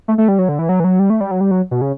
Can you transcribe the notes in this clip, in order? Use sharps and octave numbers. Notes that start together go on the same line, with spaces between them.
A3
A3
G3
F#3
D3
E3
F#3
E3
F#3
G3
A3
G3
F#3
G3
F#3
B2
C#3